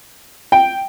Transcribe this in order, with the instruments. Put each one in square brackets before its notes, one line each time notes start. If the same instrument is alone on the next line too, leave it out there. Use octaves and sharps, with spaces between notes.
[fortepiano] G5